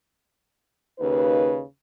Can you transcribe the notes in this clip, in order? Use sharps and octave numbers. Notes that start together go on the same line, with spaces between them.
D#2 C#3 D#4 B4